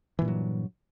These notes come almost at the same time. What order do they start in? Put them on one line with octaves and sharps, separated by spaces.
E3 A#2 G2 F#3